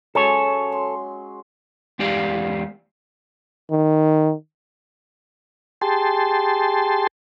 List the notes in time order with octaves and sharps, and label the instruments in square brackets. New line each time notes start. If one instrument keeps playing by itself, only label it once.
[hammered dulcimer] F#3 G#3 C#4 [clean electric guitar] A4 C#5
[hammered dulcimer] C6
[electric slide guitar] E2 G#3 G4 D5 F5
[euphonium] D#3
[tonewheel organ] G4 G#4 A5 C6